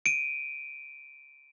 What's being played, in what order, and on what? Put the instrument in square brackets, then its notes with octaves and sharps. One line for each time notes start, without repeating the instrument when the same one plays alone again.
[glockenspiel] D7 D#7